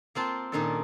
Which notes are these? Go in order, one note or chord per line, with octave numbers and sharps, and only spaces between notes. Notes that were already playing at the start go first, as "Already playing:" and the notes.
A#3 C4 F4 A5
A#2 D#3 A#3 C#4 D4 A4